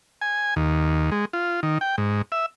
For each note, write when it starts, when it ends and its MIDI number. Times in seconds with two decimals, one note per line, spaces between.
0.22 0.54 80
0.56 1.10 39
1.11 1.25 56
1.33 1.60 65
1.63 1.78 51
1.81 1.96 79
1.98 2.22 44
2.32 2.46 76